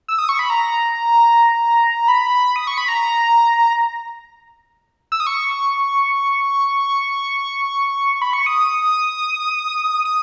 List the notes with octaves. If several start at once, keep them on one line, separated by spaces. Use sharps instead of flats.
E6
D#6
C#6
B5
A#5
B5
D#6
C#6
B5
A#5
E6
D#6
C#6
B5
C#6
D#6
D#6